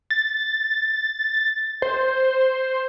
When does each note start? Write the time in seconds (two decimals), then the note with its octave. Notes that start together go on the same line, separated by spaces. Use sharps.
0.10 A6
1.82 C5